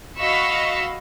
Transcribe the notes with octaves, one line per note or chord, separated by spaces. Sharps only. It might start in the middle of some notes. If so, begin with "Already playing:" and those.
F#4 D#5 F5 B5 C#6 E6